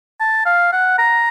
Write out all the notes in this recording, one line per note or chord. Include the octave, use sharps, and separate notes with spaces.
A5
F5
F#5
A#5